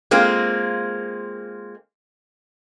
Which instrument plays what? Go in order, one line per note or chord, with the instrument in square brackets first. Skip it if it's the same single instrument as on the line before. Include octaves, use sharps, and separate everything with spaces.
[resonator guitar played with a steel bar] G#3 A#3 C4 F4